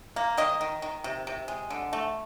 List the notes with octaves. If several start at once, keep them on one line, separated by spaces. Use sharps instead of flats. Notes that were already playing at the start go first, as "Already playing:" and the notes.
A#3
D#3 D#5
D#3
D#3
C3
C3
G#3
D3
A3